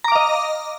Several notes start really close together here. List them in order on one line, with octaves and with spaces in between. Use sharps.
A#5 D6 F5 D#5